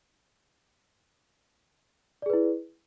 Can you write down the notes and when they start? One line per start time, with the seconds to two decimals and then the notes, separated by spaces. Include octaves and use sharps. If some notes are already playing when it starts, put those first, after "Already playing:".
2.22 D5
2.26 G#4
2.30 B4
2.33 E4